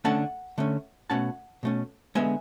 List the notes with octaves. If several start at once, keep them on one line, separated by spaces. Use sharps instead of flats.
D3 A3 C#4 F#5 A5
D3 A3 C#4
B2 A3 C#4 F#5 A5
B2 A3 C#4
D3 G#3 B3 E5 G#5